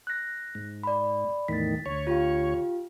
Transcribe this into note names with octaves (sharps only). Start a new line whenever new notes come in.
F#6 A#6
G#2
D5 B5
E2 A2 D#3 A6 B6
D2 C#5
F4 G4 F5